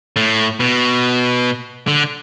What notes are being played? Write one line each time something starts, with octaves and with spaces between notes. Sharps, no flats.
A2
B2
D3